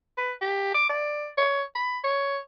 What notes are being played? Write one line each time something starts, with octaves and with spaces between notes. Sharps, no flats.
B4
G4
D6
D5
C#5
B5
C#5